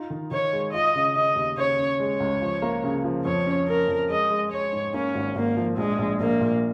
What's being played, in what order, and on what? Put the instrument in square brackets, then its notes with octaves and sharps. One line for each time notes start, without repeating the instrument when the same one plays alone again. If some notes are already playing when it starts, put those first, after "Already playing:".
Already playing: [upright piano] D#4 F4
D#3
[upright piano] D#3 [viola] C#5
[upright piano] G#3
[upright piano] F4 [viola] D#5
[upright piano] C#3
[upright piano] C#3 [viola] D#5
[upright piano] D#2
[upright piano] C#3 [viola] C#5
[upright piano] C#4
[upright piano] G#3 [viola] C#5
[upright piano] C#2
F3
A#3
C#3
F3
[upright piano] F2 [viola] C#5
[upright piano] C#4
[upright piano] C#4 [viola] A#4
[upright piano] F2
[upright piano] G#3 [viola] D#5
[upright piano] G#3
[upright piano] G#3 [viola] C#5
[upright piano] G#2
[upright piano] A#3 [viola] C#4
[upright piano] G#1
[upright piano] G#1 [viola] A#3
[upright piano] F3
[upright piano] A#1 [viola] G#3
[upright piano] A#1
[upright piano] A#1 [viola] A#3
[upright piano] A#2